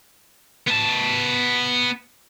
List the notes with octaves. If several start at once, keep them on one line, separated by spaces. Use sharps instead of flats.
B3 A5